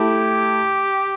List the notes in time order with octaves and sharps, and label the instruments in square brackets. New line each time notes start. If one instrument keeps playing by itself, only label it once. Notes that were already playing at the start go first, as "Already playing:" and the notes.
Already playing: [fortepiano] A3 E4 [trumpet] G4